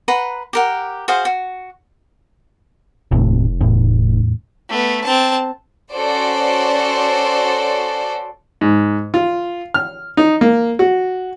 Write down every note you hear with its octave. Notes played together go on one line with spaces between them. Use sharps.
B4 F#5 A#5 C6
G4 A#4 F#5
F#4 G#4 C5 F5
F#4
F1 D#2 A2 C3
E2 A2
A3 B3
C4 A5
C#4 F#4 A4 C5 D5
G#2
F4
F6
D#4
A#3
F#4